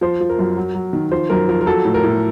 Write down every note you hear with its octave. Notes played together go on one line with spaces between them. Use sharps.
F3 C5
F3
A#4
F#2
F#3
F#3
D#3
F3 C5
F#2 A#4
F3 A#4
A#4
F#3 A4
A2
A#4
A2